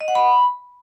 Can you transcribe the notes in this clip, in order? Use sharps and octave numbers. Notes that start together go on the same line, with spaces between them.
D#5
F#5
B5